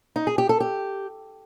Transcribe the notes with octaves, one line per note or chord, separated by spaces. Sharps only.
D#4
G#4
G4
A4
G4